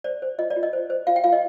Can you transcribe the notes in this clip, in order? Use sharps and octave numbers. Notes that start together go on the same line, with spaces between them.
C5 D5
C5
F4 D#5
D5
F4
D#5
C5
C5
F4 F5
G5
F4 F5
D#5